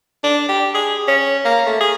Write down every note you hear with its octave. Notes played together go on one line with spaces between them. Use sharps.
D4
G4
G#4
C#4
A#3
A3
G#4